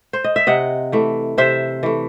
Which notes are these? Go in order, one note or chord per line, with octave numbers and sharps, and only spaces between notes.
C5
D#5
E5
C3 D#5 F#5
E3 A3
C3 C5 E5
E3 A3